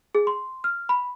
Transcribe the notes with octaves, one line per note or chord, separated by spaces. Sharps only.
G#4
C6
F6
B5